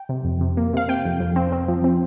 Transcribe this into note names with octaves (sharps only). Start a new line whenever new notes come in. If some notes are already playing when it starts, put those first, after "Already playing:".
Already playing: G5
C3
F2
C3
A#3
C3 F5
C3 G5
F2
F2
C4
C4
F3
C4